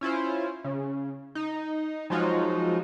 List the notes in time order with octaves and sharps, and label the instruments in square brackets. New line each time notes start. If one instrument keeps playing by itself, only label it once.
[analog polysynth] C#4 E4 F4 C5
C#3
D#4
F3 F#3 G#3 D#4 F4 F#4